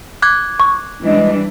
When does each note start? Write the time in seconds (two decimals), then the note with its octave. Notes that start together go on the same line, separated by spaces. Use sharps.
0.22 D6 F#6 G#6
0.60 C#6
1.04 E3 G3 G#3 D4